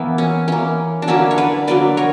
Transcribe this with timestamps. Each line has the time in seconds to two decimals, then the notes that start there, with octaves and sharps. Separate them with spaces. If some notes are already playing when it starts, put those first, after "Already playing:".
Already playing: E3 A#3 B3 E4
0.18 C#4
0.48 E3 A#3 C#4
1.02 D4
1.08 D3 F#3 A#3 C#4 E4
1.31 C#5
1.38 B4 D5
1.67 D3 F#3 A#3 B4 D5
1.97 A#4 C#5